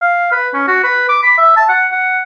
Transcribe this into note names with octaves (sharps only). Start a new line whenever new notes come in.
F5
B4
C#4
F#4
B4
D6
B5
E5
A5
F#5
F#5